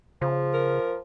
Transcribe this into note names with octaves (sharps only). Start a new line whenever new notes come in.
C#3 F3
A#4